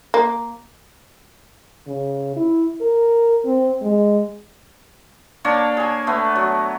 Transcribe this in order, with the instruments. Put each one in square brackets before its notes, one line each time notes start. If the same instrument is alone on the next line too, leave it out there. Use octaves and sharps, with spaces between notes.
[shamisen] A#3
[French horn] C#3
E4
A#4
C4
G#3
[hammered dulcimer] A#3 D4 C#5 A5
G#4 G#5
A3 B3
F#3